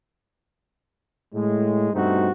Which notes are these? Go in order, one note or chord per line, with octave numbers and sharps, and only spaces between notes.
A2 G#3
G2 B2 A3 C4 D#4 F#4